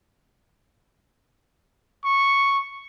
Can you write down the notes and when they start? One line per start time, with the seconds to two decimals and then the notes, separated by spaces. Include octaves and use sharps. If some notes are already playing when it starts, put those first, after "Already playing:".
2.04 C#6